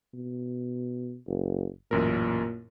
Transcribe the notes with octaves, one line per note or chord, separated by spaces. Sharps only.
B2
F#1
A1 F#2 A#2 A#4